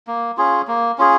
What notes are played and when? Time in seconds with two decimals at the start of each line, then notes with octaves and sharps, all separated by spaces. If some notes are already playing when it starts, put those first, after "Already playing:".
0.07 A#3
0.37 C#4 F4 G#4
0.68 A#3
0.98 C#4 F4 G#4